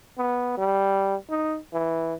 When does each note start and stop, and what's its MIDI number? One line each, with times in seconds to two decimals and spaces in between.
0.18 0.56 59
0.57 1.15 55
1.30 1.57 63
1.73 2.14 52